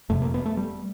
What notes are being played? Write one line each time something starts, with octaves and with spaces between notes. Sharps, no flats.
F#1 F2 C3 A3
A#3
B3
A3
G3